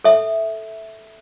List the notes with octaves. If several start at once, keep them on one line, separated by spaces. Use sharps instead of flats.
A4 E5